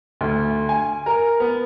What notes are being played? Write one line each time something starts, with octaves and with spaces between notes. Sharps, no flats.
D2
G#5
A#4
B3